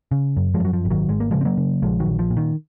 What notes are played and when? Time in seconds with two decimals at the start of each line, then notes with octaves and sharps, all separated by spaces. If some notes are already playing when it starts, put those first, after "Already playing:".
0.12 C#3
0.37 F#2
0.54 F3 G#3
0.60 F#2 F#3
0.73 F3
0.85 G#1
0.90 D#3 F#3
1.09 G#1 G#3
1.20 A#3
1.31 C#3 F3 G#3
1.41 C4
1.45 F#3 A#3
1.57 C#3
1.82 A#1 F3 G#3
2.00 D#3 F#3
2.06 A#1
2.19 F3
2.30 A#2
2.37 D#3